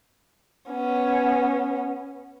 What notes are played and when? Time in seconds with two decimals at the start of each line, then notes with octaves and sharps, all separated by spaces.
0.70 B3 C#4